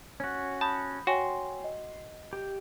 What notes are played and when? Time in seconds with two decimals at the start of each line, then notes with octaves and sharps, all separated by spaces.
0.20 C#4 F#4
0.61 A5 B5 D#6 G6
1.07 F#4 C#5 G5 G#5 C6
1.64 D#5
2.33 G4